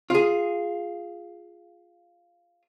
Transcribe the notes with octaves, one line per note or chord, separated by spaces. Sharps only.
F4 G#4